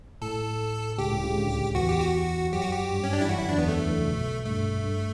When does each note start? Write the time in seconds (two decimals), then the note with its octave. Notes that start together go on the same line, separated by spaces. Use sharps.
0.22 A2 A4
0.98 C#2 C#3 G4
1.11 A2
1.24 C#2 C#3
1.37 D2 D3
1.75 E2 E3 F#4
1.89 G4
2.01 F#4
2.52 F#2 F#3 G4
2.61 F#4
2.72 G4
2.91 G2 G3
3.04 C#4
3.13 D4
3.21 E4
3.25 E3
3.29 F#2 F#3 F#4
3.39 E4
3.43 D3
3.49 E2 E3 D4
3.58 B3
3.68 D2 D3 A3
3.80 E3
3.89 D3
3.98 C#3
4.07 B1 B2
4.45 G2 A3
4.84 G2